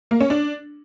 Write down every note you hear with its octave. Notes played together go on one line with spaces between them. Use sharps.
A#3
C#4
D4